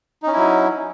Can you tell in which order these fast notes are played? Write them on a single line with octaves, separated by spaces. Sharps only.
D#4 C#4 E4 F#3